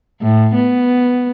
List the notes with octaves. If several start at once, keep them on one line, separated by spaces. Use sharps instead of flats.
A2
B3